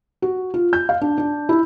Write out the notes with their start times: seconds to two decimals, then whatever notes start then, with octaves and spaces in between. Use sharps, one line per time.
0.22 F#4
0.54 F4
0.73 G6
0.89 F5
1.01 D4
1.18 D4
1.49 E4